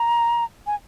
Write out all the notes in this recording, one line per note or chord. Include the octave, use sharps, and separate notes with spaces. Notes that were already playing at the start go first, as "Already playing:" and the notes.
Already playing: A#5
G#5